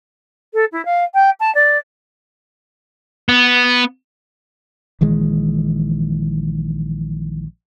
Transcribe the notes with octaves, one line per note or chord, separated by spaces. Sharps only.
A4
E4
F5
G5
A5
D5
B3
A#1 D#3 E3 G#3